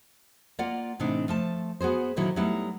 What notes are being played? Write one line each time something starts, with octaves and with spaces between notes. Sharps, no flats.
A#3 F4 D5 F#5
A2 C3 E3 D4 D#4
F3 A3 A5
B3 F#4 G#4 C5
A#2 D3 D#3 F#3 E4 F4
F#3 G3 A3 B3 D#4 E4